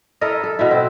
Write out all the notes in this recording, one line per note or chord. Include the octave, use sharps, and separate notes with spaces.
E4 A4 A#4 D#5
A4
B2 E4
C4